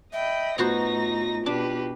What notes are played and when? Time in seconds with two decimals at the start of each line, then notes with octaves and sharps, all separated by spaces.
0.13 D#5 E5 G5 B5
0.58 A2 B3 D#4 F4 F#4 C5 A#6
1.46 B2 D4 G4 B4